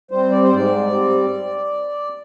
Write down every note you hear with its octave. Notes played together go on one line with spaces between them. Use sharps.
G3 C4 C5
D5
C5
G#2 D5
G3 C4